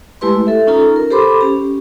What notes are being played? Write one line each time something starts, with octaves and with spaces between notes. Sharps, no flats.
G#3 A3 E4 G4 B4 C6
A4 E5
C#4 D#4 F4 A4 A#5
A#4
G4 A4 C5 B5 C6 D6
C#4 G4